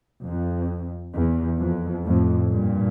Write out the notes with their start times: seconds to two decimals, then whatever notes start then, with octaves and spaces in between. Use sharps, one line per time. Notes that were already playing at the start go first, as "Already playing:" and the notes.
0.24 F2
1.14 E2
1.60 F2
2.04 F2 A2
2.50 G2 A#2